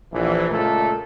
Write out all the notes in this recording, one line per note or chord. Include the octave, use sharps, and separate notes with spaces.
A#1 E3
C#2 A#2 A3 A4 A#4